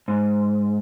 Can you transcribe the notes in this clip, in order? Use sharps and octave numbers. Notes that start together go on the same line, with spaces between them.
G#2